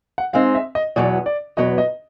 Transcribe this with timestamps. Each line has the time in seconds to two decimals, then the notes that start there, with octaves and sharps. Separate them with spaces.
0.18 F#5
0.33 G#3 C4 D#4 F5
0.55 E5
0.75 D#5
0.96 E2 B2 F#3 B3 D5
1.26 D5
1.57 E2 B2 F#3 B3 D#5
1.78 D#5